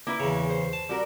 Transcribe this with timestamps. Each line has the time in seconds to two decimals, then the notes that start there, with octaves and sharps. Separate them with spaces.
0.07 A#3 E4 B4
0.20 E2 C#3
0.50 C5
0.73 A5
0.89 G3 F#4 A#4